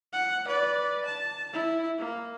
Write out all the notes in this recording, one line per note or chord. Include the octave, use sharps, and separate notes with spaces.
F#5
B4 D5
A5
E4
A#3